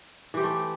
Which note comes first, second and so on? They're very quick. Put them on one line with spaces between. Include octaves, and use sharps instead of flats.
E3 G4 C4 A3